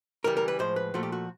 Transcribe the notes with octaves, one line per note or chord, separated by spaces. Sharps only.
C#3 E3 G3 A#4
A#4
B4
A2 F3 G#3 C5
B4
A#2 F3 A3 F#4
G4
F#4